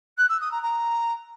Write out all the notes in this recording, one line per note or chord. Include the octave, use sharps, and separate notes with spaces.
F#6
E6
D#6
A#5
A#5